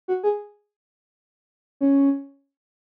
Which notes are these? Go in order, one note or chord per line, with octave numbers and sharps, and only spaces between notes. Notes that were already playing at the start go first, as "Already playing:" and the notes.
F#4
G#4
C#4